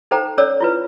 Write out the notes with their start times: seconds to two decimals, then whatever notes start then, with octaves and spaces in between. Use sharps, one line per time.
0.11 D#4 A4 C5 G5 A#5
0.38 C#4 A4 C#5 D5 E6
0.60 E4 F4 B4